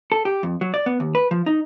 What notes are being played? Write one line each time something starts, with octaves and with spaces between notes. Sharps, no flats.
A4
G4
F2
F#3
D5
B3
D#2
B4
F3
D#4